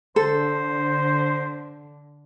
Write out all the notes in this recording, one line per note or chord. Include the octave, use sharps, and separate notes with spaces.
D3 A4 C5